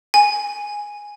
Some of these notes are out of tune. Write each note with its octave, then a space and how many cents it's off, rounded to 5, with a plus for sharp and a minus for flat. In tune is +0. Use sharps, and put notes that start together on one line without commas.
G#5 -5